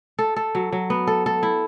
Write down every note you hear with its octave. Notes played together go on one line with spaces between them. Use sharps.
A4
A4
F#3
F#3
B3
A4
A4
E4